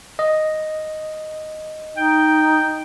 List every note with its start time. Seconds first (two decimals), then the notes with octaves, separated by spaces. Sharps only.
0.19 D#5
1.97 D#4 G5